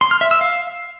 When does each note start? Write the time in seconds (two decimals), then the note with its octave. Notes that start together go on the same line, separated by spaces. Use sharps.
0.01 C6
0.11 F6
0.21 E5
0.31 E6
0.41 F5